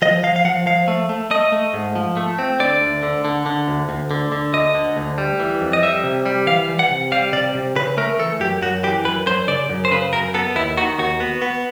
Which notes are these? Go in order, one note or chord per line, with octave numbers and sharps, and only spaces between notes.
F3 D#5
F3 F5
F5
F3 F#5
F3 F5
A3
A3
A3 D#5
A3
G#2
F3
A3
C4
D3 D5
D2
D3
D3
D3
D2
D2
D3
D3
D2 D#5
D3
D2
G3
E3
F2
D#5
G3 E5
C3
G3
E3 F5
E3
F#5
C3
G3 F5
C3 D5
C3
C#3 B4
A3 A#4
E3 A4
F#2 G4
F#2 F#4
E3 G4
F#2 B4
F#2 C5
C#3 D5
F#2
C5
C#3 B4
F#2 A#4
B3 A4
D#2 E4
D#3 F#4
D#2 F#4
B3
B3